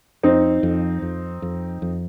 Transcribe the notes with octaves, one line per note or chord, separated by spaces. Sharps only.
F2 C4 D#4
F2
F2
F2
F2